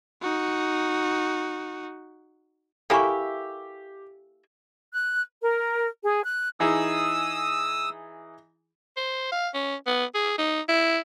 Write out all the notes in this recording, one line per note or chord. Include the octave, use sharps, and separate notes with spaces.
D#4 F#4
A#3 E4 G4 A4 E5 G#5 C#6
F#6
A#4
G#4
F#6
E3 D#4 G#4 D#6 E6
C5
F5
C#4
B3
G#4
D#4
E4